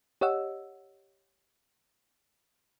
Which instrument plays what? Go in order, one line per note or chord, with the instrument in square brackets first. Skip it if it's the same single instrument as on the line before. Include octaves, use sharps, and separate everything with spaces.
[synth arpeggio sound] G4 C#5 D#5 F#5 E6